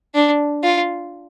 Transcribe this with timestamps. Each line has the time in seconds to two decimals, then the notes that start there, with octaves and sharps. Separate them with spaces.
0.15 D4
0.64 F4